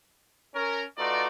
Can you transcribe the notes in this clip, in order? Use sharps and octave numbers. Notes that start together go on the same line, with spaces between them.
C#4 A#4
A3 D#4 F4 F#4 B4 D5